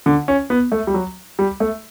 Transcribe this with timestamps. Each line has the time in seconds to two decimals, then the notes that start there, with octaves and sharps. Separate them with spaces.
0.06 D3
0.28 C#4
0.50 B3
0.72 A3
0.87 G3
0.94 F#3
1.39 G3
1.60 A3